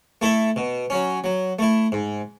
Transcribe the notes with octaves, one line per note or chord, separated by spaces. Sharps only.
A3 E4 A4 E5
B2
F#3 C#4
F#3
A3 E4
G#2